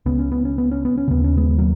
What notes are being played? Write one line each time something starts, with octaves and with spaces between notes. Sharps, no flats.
C#2 C#3 B3
C#4
B3
C#4
B3
C#4
B3
C#4
D#2 C#3 B3
C#4
G#3 B3
F#3 A#3